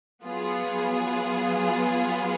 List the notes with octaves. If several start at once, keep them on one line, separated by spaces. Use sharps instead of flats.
F#3 B3 F4 G#4